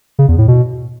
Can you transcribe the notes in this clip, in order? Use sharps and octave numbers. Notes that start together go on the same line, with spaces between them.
C#3
E2
A2
B2